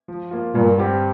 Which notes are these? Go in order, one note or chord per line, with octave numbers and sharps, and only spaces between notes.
F3
A#3 F4
G2 A#2
G3 C4 G4